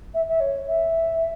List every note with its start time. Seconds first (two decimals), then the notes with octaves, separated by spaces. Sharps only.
0.14 E5
0.29 E5
0.40 C#5
0.67 E5